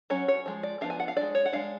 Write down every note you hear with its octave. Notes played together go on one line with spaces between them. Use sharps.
F#3 C#4 C#5
C#5
F3 G#3
D5
F3 B3 D4 F5
G#5
F#5
F5
G#3 D4 D5
C#5
F#5
G#3 D4 F5